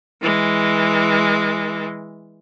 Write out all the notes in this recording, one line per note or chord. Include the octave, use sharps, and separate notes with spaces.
E3 G#3